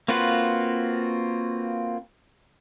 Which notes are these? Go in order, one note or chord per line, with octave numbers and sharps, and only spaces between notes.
A#3 C4 F4 F#4 B4